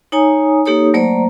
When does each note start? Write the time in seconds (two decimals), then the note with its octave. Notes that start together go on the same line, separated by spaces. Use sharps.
0.12 D#4 C#5 G#5 A#5 D#6
0.66 A#3 D#4 G4 A4 C#5 D#6
0.94 F#3 A3 A#3 C5 D5 A#5